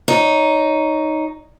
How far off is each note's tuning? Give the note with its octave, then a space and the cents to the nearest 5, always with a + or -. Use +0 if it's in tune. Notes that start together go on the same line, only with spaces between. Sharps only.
D#4 +0 C#5 +15